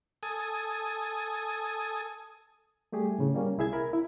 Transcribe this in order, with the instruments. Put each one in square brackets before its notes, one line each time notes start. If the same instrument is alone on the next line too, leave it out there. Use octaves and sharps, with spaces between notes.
[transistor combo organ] A4 G#5 D#6
[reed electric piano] G3 A3 G4 G#4
A2 C#3
G3 A#3 C#4
C2 E4 G#4 E5 G#6
A#4 B5
E4